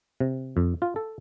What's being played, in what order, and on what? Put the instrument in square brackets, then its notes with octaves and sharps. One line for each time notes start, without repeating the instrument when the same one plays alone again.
[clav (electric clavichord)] C3
F2
F4
A4